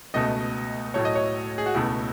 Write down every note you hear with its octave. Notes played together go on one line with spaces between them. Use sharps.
C#2 B2 A3 D#5
A2 F#3 A3 C#5
D#5
C#5
G#4
F#4
C#2 B2 A3 E4